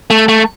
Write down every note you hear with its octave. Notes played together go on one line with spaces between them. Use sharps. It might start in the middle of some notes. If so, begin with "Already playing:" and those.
A3
A3